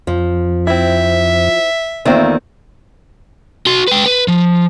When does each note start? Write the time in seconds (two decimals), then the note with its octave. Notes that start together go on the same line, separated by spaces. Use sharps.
0.07 F2 F3
0.67 C4 E4 E5
2.05 E2 D#3 A3 A#3 C4 F4
3.66 F#4 C6
3.88 B4 G5
4.06 B4
4.28 F3